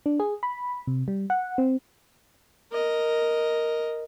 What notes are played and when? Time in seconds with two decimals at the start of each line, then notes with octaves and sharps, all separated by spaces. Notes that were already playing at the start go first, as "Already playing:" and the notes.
0.06 D4
0.20 G#4
0.43 B5
0.87 C3
1.08 G3
1.30 F#5
1.58 C4
2.72 A#4 D#5